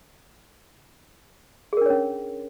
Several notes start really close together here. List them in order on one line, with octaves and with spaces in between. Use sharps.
G#4 A#4 D4 C#5 C#4